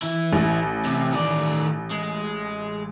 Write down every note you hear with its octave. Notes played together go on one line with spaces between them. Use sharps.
E3 E4
A1
C3
D#3 D5
G#3